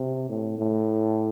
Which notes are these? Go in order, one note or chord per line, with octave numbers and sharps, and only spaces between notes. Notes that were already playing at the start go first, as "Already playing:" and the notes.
Already playing: C3
A2
A2